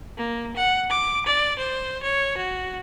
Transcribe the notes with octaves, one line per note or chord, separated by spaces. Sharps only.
A#3
F#5
D6
D5
C5
C#5
F#4